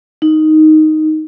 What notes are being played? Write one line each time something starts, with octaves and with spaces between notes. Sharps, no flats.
D#4